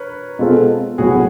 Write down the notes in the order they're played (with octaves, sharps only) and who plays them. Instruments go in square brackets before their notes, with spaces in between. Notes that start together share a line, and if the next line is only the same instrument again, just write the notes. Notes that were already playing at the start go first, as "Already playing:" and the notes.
Already playing: [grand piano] A#4 B4 C#5
[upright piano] B2 G#3 C4 F4 A4
[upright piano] B1 A2 F#3 B3 [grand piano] F#4 G#4